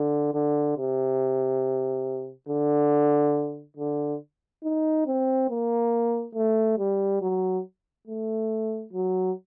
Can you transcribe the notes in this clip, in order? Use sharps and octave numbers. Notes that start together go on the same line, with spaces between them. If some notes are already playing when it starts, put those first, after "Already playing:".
Already playing: D3
D3
C3
D3
D3
D#4
C4
A#3
A3
G3
F#3
A3
F#3